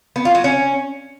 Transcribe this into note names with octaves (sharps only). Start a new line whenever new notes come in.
B3
F4
F#3
C#4